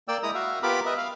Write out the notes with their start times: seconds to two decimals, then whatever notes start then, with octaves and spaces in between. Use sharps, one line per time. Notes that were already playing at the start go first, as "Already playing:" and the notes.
0.08 A#3 D5 G5 E6
0.23 G#3 E4 A#5 D#6
0.34 F#4 E5 F5
0.63 B3 F4 G4 A#4 B5 D6
0.86 B4 D#5 E5
0.97 F5